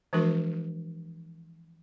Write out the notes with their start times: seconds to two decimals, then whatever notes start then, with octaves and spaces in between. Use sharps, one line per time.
0.13 E3 F3 G#3 D4 F#4 A#4